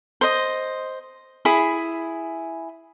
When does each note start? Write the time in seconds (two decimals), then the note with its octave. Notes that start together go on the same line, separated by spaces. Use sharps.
0.21 C5 D#5
1.45 E4 G#4 B5